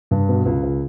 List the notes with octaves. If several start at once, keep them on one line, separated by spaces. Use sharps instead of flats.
G2
B2
C#2
C#2